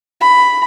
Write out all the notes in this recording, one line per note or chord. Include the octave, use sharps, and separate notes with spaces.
B5